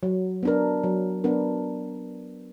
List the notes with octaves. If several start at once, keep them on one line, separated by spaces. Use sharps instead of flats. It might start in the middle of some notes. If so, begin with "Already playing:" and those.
F#3
B3 D4 A#4
F#3
B3 D4 A#4